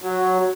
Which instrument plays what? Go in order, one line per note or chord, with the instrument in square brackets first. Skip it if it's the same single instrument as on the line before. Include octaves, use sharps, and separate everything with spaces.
[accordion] F#3